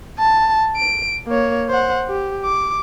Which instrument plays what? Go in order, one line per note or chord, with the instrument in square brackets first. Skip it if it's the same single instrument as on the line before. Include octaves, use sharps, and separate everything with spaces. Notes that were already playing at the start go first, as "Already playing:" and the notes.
[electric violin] A5
D7
A#3 C#5
C5 F#5
G4
D6